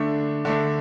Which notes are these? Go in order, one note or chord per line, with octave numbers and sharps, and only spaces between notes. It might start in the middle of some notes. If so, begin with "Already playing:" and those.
Already playing: D3 A3 D4
D3 A3 D4